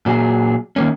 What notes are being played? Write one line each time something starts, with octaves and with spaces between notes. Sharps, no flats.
A#2 F#3 G#4
D#3 A#3 C#4